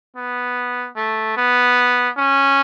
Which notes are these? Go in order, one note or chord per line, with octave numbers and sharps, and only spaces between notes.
B3
A3
B3
C#4